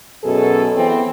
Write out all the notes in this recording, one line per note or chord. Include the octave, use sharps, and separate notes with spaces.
F#2 B2 G#4 A4
E3 B3 C4